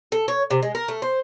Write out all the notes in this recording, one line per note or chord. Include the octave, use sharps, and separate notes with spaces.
A4
C#5
C3
G#3
A#4
A3
C5